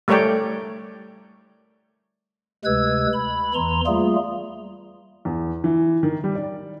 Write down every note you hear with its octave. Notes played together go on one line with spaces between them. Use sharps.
G3 A3 A#4 C#5 D5 G5
D2 C3 G#3 B4 E6 G#6
B5
E2 E3 A#5 C6
G3 A3 A#3 F4 G#4
E2
E3
D#3
G3
D5